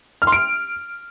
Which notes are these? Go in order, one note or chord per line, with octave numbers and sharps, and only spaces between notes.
F6
C6
D7